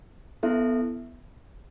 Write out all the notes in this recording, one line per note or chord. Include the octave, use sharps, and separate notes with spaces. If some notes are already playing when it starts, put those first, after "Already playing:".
B3 E4 A4 E5